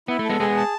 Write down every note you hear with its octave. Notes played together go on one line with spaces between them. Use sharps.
B3 E4
A3 A4
G#3 B3
G#3 B3 G#4
A5